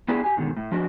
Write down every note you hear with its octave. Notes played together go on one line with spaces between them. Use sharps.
B3 D4 E4 G4 G#4 B4
G4 G#5
G#2 B2 D3 D#3
A2
F3 D4 F#4 D#5